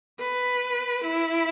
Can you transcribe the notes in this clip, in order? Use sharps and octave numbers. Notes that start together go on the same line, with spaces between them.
B4
E4